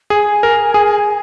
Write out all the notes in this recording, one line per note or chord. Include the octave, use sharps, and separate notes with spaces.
G#4 G#5
A#4
G#4